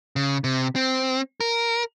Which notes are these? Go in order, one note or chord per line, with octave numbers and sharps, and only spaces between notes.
C#3
C3
C4
A#4